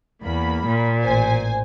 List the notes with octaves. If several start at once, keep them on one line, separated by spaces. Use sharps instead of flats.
E2 A#3 B5
A#2
A1 C5 G#5